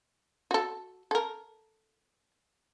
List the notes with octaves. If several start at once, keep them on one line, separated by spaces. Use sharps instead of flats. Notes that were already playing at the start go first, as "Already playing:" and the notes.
F#4 A4
A4 A#4